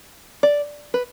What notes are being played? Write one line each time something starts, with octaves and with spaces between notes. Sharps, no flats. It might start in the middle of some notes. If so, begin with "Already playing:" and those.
D5
B4